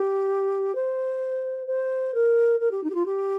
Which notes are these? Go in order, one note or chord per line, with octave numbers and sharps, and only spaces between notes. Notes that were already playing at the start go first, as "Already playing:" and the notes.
Already playing: G4
C5
C5
A#4
A#4
G4
D#4
G4
F4
G4